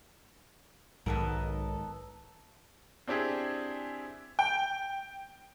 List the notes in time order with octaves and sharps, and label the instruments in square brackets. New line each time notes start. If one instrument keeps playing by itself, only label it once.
[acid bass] B1 [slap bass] G#2 D#3 G#3 [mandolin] B3 A4 A#4
[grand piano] C4 D4 E4 G4 G#4
[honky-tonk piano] G5